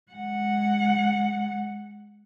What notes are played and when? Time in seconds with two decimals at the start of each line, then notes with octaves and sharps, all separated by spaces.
0.12 G#3 F#5